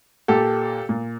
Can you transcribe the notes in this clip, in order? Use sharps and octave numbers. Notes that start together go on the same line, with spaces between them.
A#2 G4 A4
A#2